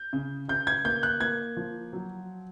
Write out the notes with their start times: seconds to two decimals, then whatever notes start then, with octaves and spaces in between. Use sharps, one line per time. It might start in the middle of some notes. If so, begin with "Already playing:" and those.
Already playing: G6
0.13 C#3
0.48 C#3 G6
0.67 G#6
0.85 A#3 G6
1.03 F#6
1.21 A#3 G#6
1.57 F3
1.93 F#3